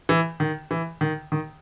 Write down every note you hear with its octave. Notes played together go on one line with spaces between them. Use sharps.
E3
D#3
E3
D#3
D#3